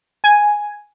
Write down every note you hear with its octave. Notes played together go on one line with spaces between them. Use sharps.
G#5